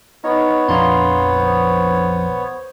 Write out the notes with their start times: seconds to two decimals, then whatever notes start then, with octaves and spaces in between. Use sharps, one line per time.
0.24 B3 D#4 C#5 D#5
0.68 A#1 F2 F3 D4 F5 A#5 C6
1.39 C5
1.69 C5